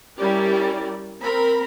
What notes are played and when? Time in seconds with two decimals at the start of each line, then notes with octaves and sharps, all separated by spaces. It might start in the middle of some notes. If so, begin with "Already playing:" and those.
0.18 G3 C#4 E4 G4 A#4 D5
1.22 C4 A#4 B5